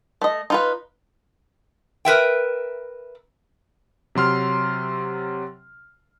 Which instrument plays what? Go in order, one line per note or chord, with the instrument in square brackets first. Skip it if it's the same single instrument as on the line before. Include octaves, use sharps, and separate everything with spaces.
[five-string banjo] A3 D#5
D#4 F4 B4
[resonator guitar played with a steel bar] A#4 B4 E5 G5
[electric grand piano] C3 F#3 C6 F6